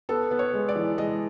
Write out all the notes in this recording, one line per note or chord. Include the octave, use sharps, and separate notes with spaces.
B3 A4
B3
C#5
G#3
D5
E3
G#3 D#5